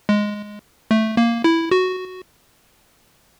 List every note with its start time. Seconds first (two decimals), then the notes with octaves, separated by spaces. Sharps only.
0.09 G#3
0.91 A3
1.17 A#3
1.44 E4
1.71 F#4